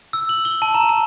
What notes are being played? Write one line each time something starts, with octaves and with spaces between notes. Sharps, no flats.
E6
F#7
G7
A5
A#5
E7